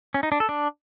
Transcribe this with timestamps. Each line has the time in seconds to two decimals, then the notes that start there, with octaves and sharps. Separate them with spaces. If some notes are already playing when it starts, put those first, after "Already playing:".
0.14 C#4
0.23 D#4
0.32 D4
0.40 A4
0.49 D4